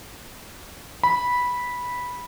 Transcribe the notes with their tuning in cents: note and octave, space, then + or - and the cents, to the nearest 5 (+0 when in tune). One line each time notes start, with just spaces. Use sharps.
B5 -10